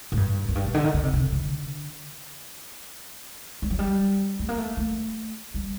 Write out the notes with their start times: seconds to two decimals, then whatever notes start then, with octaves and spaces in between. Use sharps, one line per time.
0.12 A2
0.17 G2
0.49 F#2
0.55 G2
0.65 A#2
0.74 D3
0.84 D#3
0.94 D3
1.03 C3
1.13 C3
1.32 D3
3.62 G3
3.70 F#3
3.79 G3
4.39 A3
4.49 A#3
4.58 A3
4.77 A3
5.54 G3